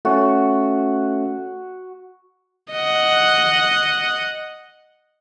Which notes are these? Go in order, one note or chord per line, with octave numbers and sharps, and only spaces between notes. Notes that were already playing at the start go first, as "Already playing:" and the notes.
A3 C#4 F#4
D#5 F#5